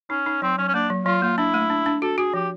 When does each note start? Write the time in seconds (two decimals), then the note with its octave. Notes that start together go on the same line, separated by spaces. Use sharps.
0.10 C#4 D#4
0.26 D#4
0.42 F#3 C4
0.58 F#3 C#4
0.68 C#4
0.74 A#3 D4
0.90 F#3
1.06 F#3 F4
1.22 A#3 F4
1.38 D4 E4
1.54 A3
1.70 D4
1.86 D4
2.02 F#4 A4
2.18 F#4 G#4
2.34 F3 G4